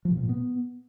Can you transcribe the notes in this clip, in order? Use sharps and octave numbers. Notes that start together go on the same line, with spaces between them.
F3
B2
A2
A#2
B3